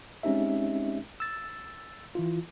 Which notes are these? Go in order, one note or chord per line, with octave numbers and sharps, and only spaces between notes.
G#3 C4 C#4 D#4 G4 E5
E6 A6
E3 E4 F4